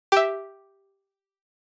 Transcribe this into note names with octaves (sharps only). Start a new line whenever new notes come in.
G4 E5